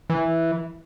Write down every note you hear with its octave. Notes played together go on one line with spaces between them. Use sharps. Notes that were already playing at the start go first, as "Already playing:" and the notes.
E3